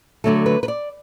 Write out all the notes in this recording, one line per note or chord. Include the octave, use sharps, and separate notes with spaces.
D2 D3 F#3 A3 A4
B4
B4
D5